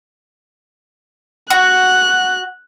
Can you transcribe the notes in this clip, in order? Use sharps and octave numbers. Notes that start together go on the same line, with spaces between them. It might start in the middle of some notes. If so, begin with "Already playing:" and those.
F#4 F#6